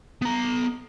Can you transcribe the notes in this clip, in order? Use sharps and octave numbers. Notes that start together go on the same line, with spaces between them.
B3 A#5